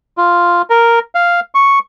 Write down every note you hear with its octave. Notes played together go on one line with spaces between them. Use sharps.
F4
A#4
F5
C#6